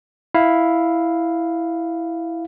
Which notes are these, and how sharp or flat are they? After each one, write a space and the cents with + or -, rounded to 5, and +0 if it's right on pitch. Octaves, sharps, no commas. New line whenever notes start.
E4 +0 F5 +0